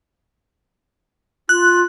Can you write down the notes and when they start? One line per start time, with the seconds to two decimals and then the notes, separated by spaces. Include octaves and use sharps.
1.49 F4 F#6